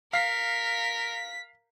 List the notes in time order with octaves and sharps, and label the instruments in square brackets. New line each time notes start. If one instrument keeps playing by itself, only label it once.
[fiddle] A#4 [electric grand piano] F5 C7 [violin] B6